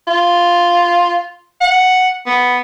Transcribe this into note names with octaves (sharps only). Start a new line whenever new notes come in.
F4
F#5
B3